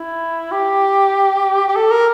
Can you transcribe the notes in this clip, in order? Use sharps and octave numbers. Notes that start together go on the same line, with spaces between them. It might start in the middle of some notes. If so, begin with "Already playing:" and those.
Already playing: E4
G4
G4
A4
A#4